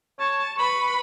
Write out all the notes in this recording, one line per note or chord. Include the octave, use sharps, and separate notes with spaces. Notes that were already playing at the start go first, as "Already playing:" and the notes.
C#5 A5
B4 B5 C#6